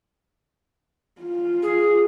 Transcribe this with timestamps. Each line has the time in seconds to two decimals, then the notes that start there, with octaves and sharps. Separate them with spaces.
1.21 F4
1.63 G#4